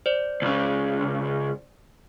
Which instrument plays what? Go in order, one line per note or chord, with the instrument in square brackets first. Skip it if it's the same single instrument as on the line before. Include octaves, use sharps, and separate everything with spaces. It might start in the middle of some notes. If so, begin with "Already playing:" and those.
[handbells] C5 D5
[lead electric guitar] C#2 C#3